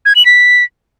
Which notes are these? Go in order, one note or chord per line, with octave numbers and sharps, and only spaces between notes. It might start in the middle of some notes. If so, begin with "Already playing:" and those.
G#6
F#7
B6